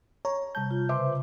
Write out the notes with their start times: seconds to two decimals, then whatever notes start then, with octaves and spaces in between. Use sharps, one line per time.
0.25 C#5 A#5
0.55 C3 G3 A5 G6
0.71 F4
0.89 C#3 B4 C5 E5 C6 D6